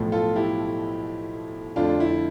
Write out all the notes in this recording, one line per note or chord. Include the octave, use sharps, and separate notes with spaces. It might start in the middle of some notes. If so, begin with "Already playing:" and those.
Already playing: B1 A2 F3 A3
F4 A4
E4 G4
F2 D3 F3 A3 D4 F4
E4